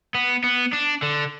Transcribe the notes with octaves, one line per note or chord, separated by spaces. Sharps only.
B3
B3
D4
D3